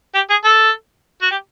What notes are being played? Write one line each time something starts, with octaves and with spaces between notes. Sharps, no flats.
G4
G#4
A4
F#4
G4